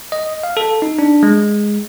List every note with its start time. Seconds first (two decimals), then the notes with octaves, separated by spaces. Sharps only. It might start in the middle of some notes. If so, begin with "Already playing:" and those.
0.12 D#5
0.43 F5
0.57 A4
0.82 D#4
0.99 D4
1.23 G#3